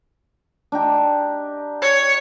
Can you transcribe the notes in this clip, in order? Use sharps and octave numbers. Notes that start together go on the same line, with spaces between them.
D4 D#4 G4
C#5